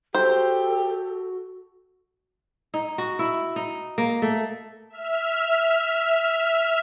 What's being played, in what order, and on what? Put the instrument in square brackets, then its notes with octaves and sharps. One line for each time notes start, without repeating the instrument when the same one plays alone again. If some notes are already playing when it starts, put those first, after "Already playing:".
[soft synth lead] F#4 [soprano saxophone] G4 [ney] A4 [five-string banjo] C5
[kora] D#4
F#4
E4
D#4
A#3
A3
[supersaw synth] E5 F6